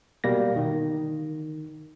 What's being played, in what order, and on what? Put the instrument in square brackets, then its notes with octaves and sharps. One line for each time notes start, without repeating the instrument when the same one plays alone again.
[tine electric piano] B2 G3 A#3 A#6
D#3